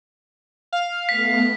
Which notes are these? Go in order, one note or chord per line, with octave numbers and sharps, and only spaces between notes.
F5
A3 B3 B6